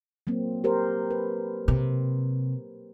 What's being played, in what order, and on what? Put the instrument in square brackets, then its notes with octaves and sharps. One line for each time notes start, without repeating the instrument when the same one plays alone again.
[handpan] F#3 A#3 C4
G4 A#4 C5
B4
[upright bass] C3